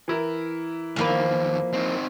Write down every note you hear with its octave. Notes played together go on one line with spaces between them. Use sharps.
E3 E4 A#4
E2 D#3 F3 A#3 B4
C4 D#4